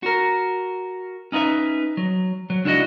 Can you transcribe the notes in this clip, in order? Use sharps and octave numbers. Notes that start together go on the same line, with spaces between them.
F#4 A#4
C#4 D#4 E4 B4 E5
F#3
F#3
C#2 D4 E4 F#4 D#5